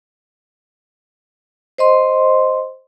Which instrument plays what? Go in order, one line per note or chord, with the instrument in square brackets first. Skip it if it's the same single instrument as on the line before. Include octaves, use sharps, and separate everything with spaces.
[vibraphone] C5 D#5 C6